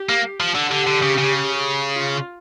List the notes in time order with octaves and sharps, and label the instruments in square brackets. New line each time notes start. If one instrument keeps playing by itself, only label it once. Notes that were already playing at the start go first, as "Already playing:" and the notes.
Already playing: [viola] G4
[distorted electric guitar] A#3
F3
D3
[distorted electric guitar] D3 [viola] G4
[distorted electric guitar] D3
C#3
C#3
[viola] F4